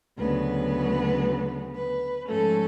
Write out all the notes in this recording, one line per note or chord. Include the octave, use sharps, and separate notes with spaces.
D2 C#3 F#3 B3 B4
B4
G#2 F3 A3 C#4 A4